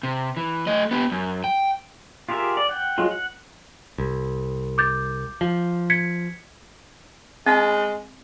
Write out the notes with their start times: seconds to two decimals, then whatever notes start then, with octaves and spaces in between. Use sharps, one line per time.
0.03 C3
0.37 E3
0.67 A3 D#5
0.91 B3 G4
1.12 F#2
1.44 G5
2.29 F4 G4 G#4 A#4 E5
2.57 D5
2.69 F#5 G5
2.98 F#3 G#3 F4
3.10 F#5
3.98 C2
4.78 D6 G6 A6
5.41 F3
5.90 G#6 B6 C#7
7.47 G#3 C4